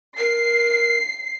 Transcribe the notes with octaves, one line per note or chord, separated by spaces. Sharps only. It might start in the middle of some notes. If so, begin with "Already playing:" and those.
A#4 C7